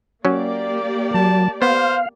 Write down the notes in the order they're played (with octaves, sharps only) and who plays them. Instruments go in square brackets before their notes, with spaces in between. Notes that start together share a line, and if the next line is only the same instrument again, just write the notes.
[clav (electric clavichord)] F#3 C#4 [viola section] A#3 G4 D5
[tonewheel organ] F#3 [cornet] A5
[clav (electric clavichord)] B3 [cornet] C5 [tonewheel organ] F5